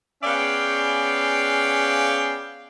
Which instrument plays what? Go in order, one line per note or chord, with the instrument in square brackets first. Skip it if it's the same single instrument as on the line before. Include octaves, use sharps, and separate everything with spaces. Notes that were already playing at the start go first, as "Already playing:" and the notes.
[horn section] B3 C#4 G#4 D5 F5 G5